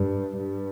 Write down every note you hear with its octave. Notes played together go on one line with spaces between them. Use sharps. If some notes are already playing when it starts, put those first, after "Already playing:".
Already playing: G2
G2